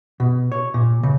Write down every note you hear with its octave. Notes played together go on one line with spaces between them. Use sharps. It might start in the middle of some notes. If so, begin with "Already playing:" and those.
B2
C#5
A#2
C#3